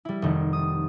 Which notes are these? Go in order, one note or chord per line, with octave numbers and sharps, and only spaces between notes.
G3 E4
F1 D#3
D#6